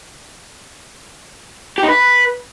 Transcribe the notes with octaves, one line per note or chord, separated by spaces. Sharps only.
G4
D#4
B4